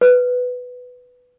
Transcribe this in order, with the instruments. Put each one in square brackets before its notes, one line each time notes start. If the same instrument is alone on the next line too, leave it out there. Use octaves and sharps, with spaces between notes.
[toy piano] B4